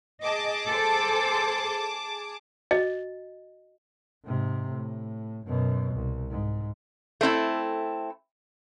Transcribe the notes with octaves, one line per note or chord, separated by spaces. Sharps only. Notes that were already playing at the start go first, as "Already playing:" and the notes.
G#4 D#5 A5 D6
A4 C5
F#4 D#5
G#2 C3
A2
F#2 B2
C2
G#2
A3 C4 D#4 E4